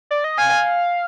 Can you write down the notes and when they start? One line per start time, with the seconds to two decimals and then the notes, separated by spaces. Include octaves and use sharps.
0.11 D5
0.24 D#5
0.38 F5 G#5